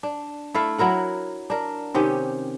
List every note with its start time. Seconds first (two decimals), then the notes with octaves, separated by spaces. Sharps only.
0.03 D4
0.55 A3 E4 A4 F5
0.78 F#3 E4 A#4 F#5
1.50 D4 A#4
1.95 C3 D#3 C#4 G4